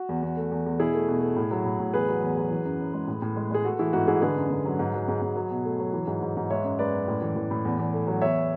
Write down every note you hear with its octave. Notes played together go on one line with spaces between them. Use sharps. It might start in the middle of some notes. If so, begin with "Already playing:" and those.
Already playing: F#4
E2
E2
A3
E2
E2
B2 E4 G#4
A3
B2
A3
A2
F#3
A2
A2
E2 G#4 B4
F#3
E2
F#3
E3
F#2
F#2
G#3
A2
A2
G#3
G#3 G#4
A3 F#4 A4
E3 E4 G#4
G#2 F#4
G#2 E4 G#4
D3 G#4 B4
F#2
D3
F#3
G#2
F#3
G#2
G#2
F#3
B2
A3
F#3
E3
G#2
G#2
G#2
G#3 C#5 E5
F#2
G#3 B4 D5
F#2
A2
E3
E3
A2
E2
E2
A3
F#3
E2 C#5 E5